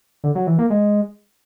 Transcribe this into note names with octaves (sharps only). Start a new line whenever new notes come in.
D3
F#3
E3
A#3
G#3